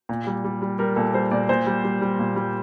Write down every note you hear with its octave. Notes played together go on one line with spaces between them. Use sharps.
A#2
G3
G3
G3
G3 A#4
A#2 A4
G3 C5
A#2 D5
A#2 C5
G3
G3
G3
A#2
G3